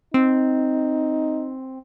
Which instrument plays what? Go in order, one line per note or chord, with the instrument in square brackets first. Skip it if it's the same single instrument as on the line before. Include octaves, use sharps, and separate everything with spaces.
[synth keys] C4 [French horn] D#4